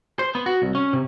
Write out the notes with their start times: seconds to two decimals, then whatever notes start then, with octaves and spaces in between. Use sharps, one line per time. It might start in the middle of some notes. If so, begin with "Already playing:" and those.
0.19 C5
0.35 B3
0.46 F#4
0.62 C2
0.75 C#4
0.93 C3